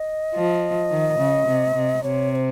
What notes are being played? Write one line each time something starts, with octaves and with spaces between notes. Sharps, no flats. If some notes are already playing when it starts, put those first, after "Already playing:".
Already playing: D#5
F3
D#3
C#3
C3
C3
C3 C#5
C#5
C5